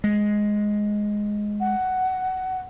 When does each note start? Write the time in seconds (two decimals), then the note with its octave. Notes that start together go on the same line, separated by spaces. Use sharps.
0.04 G#3
1.60 F#5